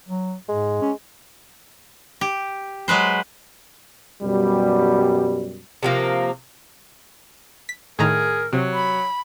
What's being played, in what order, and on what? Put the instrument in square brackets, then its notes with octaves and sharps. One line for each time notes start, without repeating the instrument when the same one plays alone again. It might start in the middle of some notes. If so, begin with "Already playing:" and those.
[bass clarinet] F#3
[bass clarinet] G#2 [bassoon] G#3
[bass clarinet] C#4
[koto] G4
F#3 G#3 B4 C5
[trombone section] F#2 B2 G3
[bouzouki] C3 F3 A#3
[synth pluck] B6
[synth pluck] A2 D#3 A#5 [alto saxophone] G#4 [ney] A#4
[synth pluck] C3 [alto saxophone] F#3
[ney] B5